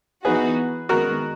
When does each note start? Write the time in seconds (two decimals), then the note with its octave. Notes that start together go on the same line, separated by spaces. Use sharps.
0.25 E3 B3 D#4 F#4 G#4 B4
0.89 D#3 G#3 B3 F#4 A#4